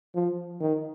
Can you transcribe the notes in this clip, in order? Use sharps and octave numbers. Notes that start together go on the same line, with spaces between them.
F3
D#3